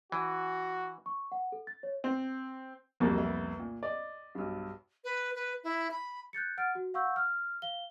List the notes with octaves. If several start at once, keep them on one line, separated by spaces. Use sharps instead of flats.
E3 F#4
C#6
F#5
A4
A6
C#5
C4
C2 F2 C3 F#3 A#3
B3 E5
A#2
D5 D#5
B1 G2
B4
B4
E4
B5
F#6 G6 A6 C#7
F#5 F6 A6 D7
F#4
F5 F#5 C#6 E6 G6
F6
F5 G7